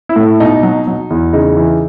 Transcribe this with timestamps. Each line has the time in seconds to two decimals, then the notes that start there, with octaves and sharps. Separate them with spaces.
0.09 E4
0.16 A2
0.40 B2 D#4
0.63 F#3
0.87 F#3
1.10 E2
1.33 C#3 D#4
1.57 E3